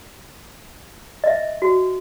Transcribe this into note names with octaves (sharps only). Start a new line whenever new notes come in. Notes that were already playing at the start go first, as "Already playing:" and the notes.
D#5 E5
F#4